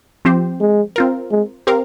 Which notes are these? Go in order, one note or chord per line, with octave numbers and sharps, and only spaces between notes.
F3 C4 G4 C5
G#3
C4 F4 A#4
G#3
C4 G4 A#4 F5